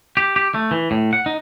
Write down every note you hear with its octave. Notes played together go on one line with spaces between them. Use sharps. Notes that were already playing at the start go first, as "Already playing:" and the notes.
G4
G4
A3
E3
A2
F#5
D#4